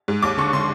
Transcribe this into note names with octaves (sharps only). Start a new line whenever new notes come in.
G#2
D#2 D6
D3 C#6
D3 C6